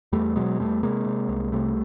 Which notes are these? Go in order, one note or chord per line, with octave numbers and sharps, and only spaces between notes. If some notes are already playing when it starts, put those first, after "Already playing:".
E2 G3 A3
B2 F#3 G#3
E2 G3 A3
C3 G#3 A#3
C3
C2
C3 G3 A3